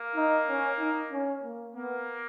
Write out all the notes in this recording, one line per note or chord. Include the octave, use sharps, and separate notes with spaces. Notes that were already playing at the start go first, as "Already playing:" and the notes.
Already playing: A#3
D#4
C#4
D#4
C#4
A#3
A#3 B3